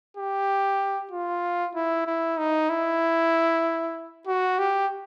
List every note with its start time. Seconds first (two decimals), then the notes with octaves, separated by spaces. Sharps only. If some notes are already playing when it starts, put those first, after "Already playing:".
0.17 G4
1.11 F4
1.75 E4
2.06 E4
2.38 D#4
2.70 E4
4.27 F#4
4.59 G4